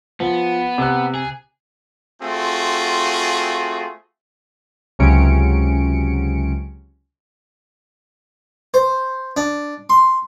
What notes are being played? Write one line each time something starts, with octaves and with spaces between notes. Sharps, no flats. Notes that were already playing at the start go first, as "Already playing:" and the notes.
F3 B3
C3 F#6
G#4
A3 C4 F4 F#4 G#4
C#2 C3 F#3 C#4 C#7 D7
C5
D4
C6